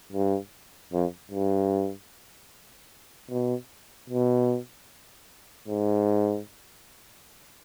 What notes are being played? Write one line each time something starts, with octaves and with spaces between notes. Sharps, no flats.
G2
F2
G2
B2
B2
G#2